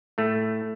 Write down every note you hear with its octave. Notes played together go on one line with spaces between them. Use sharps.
A2 A3